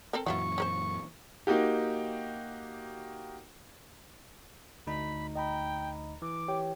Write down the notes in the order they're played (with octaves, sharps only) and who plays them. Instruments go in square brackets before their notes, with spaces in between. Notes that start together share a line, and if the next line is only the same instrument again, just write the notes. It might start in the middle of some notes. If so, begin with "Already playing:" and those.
[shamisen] C4 A4 A#4
[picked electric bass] F#2 A#2 E3 [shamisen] F#3 E4 F4 [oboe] C#6
[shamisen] C#4 A#4 C5
[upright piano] A#3 D#4 F#4 G4
[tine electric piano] D2 D#4 [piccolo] B5
[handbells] D#5 A#5 B5 [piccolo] G5
[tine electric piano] E3 [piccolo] D6
[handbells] G4 C#5 G5